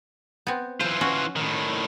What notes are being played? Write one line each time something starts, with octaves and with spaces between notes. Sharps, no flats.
B3 C4
E3 F4 C5
C#4 F#4
A2 D#3